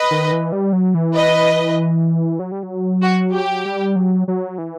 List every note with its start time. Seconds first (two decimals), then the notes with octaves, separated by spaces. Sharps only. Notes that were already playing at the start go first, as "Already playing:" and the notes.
Already playing: B4 D#5
0.11 D#3
0.32 E3
0.52 G3
0.73 F#3
0.94 E3
1.15 B4 D#5
2.39 F#3
2.52 G3
2.63 F#3
3.02 F#4
3.33 G4
3.65 G3
3.96 F#3
4.28 F#3
4.58 E3